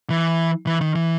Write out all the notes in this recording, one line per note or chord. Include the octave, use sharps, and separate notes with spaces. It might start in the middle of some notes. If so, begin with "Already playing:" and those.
E3
E3
D#3
E3